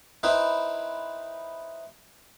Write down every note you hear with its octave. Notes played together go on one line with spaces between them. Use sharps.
C4 D#4 E4 B4